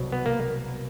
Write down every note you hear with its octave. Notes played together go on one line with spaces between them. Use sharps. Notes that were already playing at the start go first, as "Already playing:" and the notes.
Already playing: C2 B2 F#3
B3
A#3